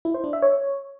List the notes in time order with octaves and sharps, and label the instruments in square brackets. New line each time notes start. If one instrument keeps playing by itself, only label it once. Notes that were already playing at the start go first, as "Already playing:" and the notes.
[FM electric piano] E4
C5
D4
E5
C#5